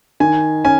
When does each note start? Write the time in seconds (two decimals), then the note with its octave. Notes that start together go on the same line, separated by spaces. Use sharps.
0.20 D#3 G#5
0.65 C#4 G#5